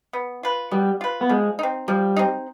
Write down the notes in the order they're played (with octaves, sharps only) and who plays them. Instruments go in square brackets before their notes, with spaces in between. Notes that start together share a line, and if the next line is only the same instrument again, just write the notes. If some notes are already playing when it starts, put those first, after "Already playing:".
[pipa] B3
F4 B4
[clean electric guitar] G3 [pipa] B3
[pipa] F4 B4
[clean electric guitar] B3
[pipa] F3 [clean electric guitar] G#3
[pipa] C4 D#4
[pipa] F3 [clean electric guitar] G3
[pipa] C4 D#4